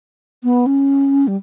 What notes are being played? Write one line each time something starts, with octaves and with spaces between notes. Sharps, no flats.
B3
C#4
G3